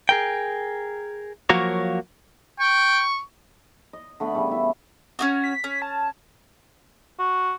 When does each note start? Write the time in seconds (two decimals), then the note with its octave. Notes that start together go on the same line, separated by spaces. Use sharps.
0.09 G#4 A#4 G5
1.49 F3 F#3 A#3 F#4 A#4 C#5
2.60 G5 C#6
3.93 D#5
4.20 D3 A3 B3 B5
4.35 C#3 E3 G3 A3
4.51 E4 E5
5.19 C#4 D#4 F#4
5.44 B6
5.64 C#4
5.82 A5
7.19 F#4